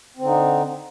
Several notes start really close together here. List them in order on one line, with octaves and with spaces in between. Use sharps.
C4 D3 D#4